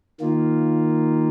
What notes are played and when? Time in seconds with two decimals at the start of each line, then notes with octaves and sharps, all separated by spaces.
0.20 D#3 A#3 F4